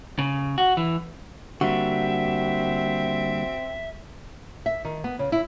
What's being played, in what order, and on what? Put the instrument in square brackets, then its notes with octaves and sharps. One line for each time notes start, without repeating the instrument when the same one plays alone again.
[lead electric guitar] C#3
F#4
E3
[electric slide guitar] D3 G3 A#3 [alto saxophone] C4 [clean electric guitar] F#4 [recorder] E5
[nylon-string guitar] E5
D#3
B3
C#3
E4